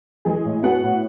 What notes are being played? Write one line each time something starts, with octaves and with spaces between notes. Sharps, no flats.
E3 G#3 G#4
A2
B3 F#4 F#5
A2